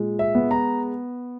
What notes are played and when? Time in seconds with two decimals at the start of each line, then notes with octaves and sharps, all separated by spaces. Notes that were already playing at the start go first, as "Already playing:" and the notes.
Already playing: A#2 G#3
0.19 E5
0.35 B3
0.51 A#5